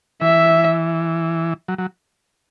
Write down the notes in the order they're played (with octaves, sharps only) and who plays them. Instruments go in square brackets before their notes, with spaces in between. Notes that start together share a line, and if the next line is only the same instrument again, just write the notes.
[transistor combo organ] E3 [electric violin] E5
[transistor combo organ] F#3
F#3